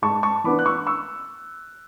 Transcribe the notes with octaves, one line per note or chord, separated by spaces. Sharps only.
G#2 A5 C#6
A5 C#6
E3 B3 D4 B5 D6
F#6
C#6 E6
C#6 E6